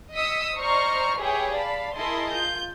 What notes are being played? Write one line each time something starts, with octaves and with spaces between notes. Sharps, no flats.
D#5 D#6 E6 B6 C#7
C5 D5 D#5 A#5 C#6 F6
G4 G#4 B4 C#5 E5 G5
D5 F5 A5 B5
E4 G#4 A#4 D#5 A5 C6
F4 G6